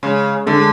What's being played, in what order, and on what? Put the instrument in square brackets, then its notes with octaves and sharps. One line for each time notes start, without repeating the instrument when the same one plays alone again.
[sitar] C#3 [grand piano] G#3
[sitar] D3 [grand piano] A3
[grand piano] G#3